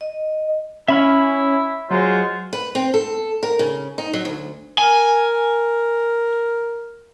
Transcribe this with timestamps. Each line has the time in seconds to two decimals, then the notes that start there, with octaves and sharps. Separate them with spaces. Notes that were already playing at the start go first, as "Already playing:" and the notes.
0.01 D#5
0.88 C#4 E4 E5 B5 F6
1.91 F#3 G#3 F4 F#4 C5
2.53 B4
2.75 C4
2.94 A4
3.43 A#4
3.59 C#3
3.98 D#4
4.13 F#3
4.25 D2
4.78 A#4 G#5